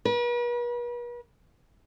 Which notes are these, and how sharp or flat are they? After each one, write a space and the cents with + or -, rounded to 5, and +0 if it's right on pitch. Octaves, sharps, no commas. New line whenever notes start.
B4 -45